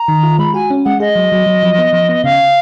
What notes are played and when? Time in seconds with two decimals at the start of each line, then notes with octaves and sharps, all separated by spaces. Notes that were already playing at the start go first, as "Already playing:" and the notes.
Already playing: A#5
0.08 D#3
0.23 F4
0.38 G#3 B5
0.54 F#4 G#5
0.70 C#4
0.85 G#3 F#5
1.00 G#4 D#5
1.16 F#3
1.32 F#3
1.46 F#3
1.63 F3
1.78 B3
1.93 F3
2.09 B3
2.24 C#3 F5